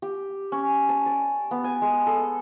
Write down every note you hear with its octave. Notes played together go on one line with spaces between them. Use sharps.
G4
C#4
A5
D5
B3
G#5
G#3
A4